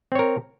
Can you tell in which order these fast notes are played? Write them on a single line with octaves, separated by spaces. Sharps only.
C4 C#5 A#4